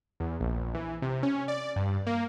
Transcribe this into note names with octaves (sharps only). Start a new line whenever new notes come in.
E2
A#1
E3
C3
C#4
D5
G2
A#3